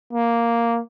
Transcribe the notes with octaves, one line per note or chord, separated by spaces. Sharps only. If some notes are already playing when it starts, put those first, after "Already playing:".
A#3